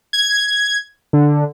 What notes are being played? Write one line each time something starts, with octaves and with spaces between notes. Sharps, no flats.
G#6
D3